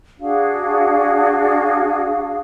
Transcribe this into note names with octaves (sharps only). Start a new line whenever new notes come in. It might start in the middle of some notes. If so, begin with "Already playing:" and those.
D4 F#4 G#4 F5